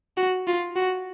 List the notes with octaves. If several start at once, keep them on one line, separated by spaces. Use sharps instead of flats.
F#4
F4
F#4